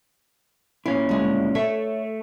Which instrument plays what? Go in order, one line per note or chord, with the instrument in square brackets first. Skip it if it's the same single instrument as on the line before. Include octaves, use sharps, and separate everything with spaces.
[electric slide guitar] A#2 C#4 E4 [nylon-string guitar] F5
[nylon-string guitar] D2 G3 G#3
[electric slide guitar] A3 [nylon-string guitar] A4 C#5 E5